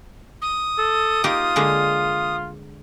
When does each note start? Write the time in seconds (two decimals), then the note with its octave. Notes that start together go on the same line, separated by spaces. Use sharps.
0.42 D#6
0.78 A4
1.24 A#3 D#4 F4 G4
1.56 D3 G#3 A#3